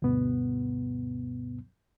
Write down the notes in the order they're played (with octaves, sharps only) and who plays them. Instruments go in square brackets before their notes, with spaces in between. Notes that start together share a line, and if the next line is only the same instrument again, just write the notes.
[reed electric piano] D2 G2 B2 B3